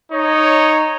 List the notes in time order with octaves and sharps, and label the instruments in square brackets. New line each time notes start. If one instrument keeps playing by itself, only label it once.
[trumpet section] D#4 C#5